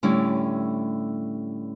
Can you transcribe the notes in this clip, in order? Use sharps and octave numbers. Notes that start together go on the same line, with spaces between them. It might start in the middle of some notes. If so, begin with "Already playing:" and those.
A2 D3 G3 C#4 E4